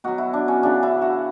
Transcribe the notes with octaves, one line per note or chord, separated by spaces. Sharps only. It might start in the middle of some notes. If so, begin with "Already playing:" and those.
B2 F#3 F#4
E4
D4
C#4
C#3 E3 D4
E4
F#4